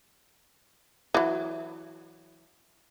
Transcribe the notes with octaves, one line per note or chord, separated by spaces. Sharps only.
E3 F#3